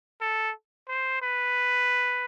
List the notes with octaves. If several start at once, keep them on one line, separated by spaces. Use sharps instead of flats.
A4
C5
B4